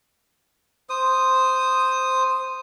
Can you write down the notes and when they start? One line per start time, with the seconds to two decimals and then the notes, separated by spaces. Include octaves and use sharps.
0.90 C5 D#6